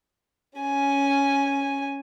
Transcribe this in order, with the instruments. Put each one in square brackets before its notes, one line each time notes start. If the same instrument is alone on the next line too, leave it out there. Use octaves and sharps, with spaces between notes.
[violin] C#4 G#5